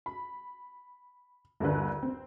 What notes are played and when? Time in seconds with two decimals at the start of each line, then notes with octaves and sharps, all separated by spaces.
0.06 B5
1.60 G1 D#2 D3 B4
2.03 C4